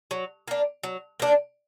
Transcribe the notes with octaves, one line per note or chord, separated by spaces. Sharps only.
F#3
A#3 D4
F#3
A#3 D4